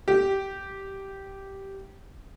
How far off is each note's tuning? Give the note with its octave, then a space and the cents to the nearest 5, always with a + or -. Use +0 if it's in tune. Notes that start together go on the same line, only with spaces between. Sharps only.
G4 -10